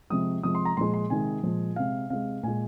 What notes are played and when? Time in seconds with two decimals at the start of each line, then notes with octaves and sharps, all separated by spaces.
0.10 C3 F3 G#3 D#6
0.43 C3 F3 G#3 D#6
0.55 C6
0.65 A#5
0.77 A#2 F3 G#3 C6
0.94 C6
1.10 C3 D#3 G#3 G#5
1.43 A#2 F3 G#3
1.76 C3 G#3 F5
2.10 C3 G#3 F5
2.43 A#2 G#3 G#5